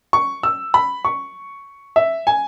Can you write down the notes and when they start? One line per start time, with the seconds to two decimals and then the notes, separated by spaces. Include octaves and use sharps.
0.13 C#6
0.43 E6
0.74 B5
1.05 C#6
1.96 E5
2.27 G#5